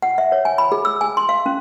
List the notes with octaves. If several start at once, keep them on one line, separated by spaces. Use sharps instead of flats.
F#5
E5
C#5
G#5
B5
G#4
E6
G#5
C6
F5
C#4